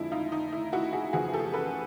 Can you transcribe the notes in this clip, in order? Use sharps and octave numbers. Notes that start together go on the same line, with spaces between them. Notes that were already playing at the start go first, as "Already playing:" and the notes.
Already playing: F2 D3 F3 G#3 E4
D#4 F4
D#4
E4
E4 F#4
F#4 G#4
F#1 E2 C#3 F3 F#4 G#4
G4 A4
A4 B4